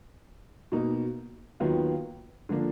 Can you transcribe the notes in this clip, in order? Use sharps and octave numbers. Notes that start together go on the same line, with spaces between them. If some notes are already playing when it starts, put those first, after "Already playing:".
B2 A#3 D#4
D#2 D#3 F#3 B3 F4
D3 F3 A#3 D4